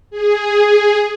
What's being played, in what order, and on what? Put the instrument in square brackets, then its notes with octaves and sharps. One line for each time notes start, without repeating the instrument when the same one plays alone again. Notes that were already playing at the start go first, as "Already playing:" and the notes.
[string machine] G#4